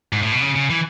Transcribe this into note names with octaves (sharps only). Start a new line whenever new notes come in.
G#2
A2
B2
C#3
C#3
E3